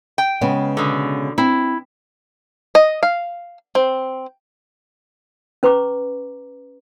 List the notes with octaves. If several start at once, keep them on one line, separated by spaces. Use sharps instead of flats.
G5
C#3 G#3 B3
B2 D3
C4 E4
D#5
F5
C4
C#4 B4 A#5 C#6 D6